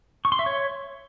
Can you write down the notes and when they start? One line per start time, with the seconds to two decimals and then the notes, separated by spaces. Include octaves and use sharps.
0.25 C#6
0.32 C6
0.39 E5
0.46 C#5